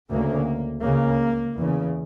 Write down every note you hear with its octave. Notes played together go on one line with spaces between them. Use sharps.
D2 C#3 A#3
C#2 C#3 A#3
E2 C#3